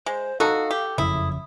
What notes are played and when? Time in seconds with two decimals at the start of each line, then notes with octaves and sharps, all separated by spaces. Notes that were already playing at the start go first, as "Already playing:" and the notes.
0.06 G#3 C5
0.40 D#4 F#4 A4 F5
0.71 G4
0.98 F#1 F2 C#3 E4 D#6